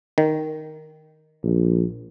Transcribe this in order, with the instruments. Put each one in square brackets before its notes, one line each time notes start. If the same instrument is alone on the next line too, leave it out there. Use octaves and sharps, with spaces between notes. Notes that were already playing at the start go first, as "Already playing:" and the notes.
[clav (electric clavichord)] D#3
[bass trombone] A#1